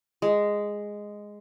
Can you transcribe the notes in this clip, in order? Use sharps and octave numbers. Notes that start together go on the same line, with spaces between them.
G#3